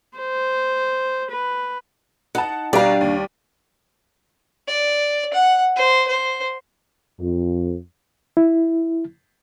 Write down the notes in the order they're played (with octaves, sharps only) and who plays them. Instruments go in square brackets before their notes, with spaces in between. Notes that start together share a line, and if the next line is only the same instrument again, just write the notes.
[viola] C5
B4
[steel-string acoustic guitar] D#4 [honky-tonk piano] F#5 A5
[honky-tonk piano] B2 A#5 [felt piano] G3 G4 [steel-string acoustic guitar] D4 F5
[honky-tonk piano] D#2
[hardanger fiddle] D5
F#5
C5
C5
[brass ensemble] F2
[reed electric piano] E4